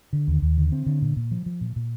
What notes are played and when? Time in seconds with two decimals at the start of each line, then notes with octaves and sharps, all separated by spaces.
0.13 D3
0.28 D#2
0.42 D#2
0.57 D3
0.72 C4
0.86 D3
1.02 A#2
1.17 A#2
1.31 F3
1.46 F3
1.61 A#2
1.76 A#2